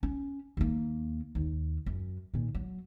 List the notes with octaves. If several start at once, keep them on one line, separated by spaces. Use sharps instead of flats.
C#4
D#2 A#3
D#2
F#2
A#2 D#3
F#3